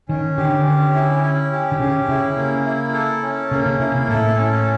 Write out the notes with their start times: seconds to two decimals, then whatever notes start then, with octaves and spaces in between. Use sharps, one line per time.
0.09 D#3 C#4
0.37 D3 G4
0.66 C#4
0.94 E4
1.23 C#4
1.52 G4
1.72 D3
1.80 C#3 C#4
2.08 C#3 E4
2.37 A#3
2.65 E4
2.94 A4
3.22 C#4
3.51 C#3 A#3
3.66 C#3
3.79 C#3 E4
3.95 C3
4.08 A2 A4
4.37 C#4